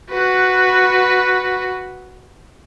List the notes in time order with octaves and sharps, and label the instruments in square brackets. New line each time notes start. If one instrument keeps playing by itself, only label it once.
[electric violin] F#4 B4